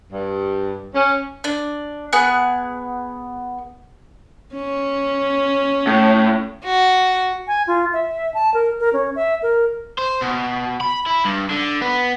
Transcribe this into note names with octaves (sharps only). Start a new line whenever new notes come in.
G2
C#4
D4
B3 G#4 F#5 F#6
C#4
A2
F#4
G#5
F4
E5
A5
A#4
A#4
C#4
E5
A#4
C5
B2
B5
E4
G2
D3
B3